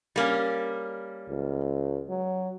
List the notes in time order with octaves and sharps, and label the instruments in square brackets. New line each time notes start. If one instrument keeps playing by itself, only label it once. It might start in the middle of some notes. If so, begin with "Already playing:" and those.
[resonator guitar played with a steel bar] G3 A#3 C#4
[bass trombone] C#2
F#3